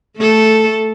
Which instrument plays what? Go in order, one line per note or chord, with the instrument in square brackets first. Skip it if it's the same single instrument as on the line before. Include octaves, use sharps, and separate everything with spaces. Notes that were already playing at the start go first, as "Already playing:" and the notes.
[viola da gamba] A3 A4